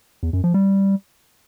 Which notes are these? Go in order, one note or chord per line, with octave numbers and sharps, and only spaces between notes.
E2
F#2
F3
G3